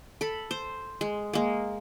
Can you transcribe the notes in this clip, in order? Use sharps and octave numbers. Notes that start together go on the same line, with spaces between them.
A4 B5
C5
G#3
G#3 A#3